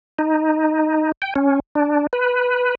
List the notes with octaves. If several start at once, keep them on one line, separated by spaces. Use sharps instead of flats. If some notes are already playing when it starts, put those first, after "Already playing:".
D#4
G5
C#4
D4
B4